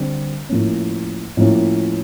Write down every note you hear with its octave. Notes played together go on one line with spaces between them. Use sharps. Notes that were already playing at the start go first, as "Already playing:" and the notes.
Already playing: D3 G3 C4
A2 F3 A#3 C#4
A2 F3 A#3 C#4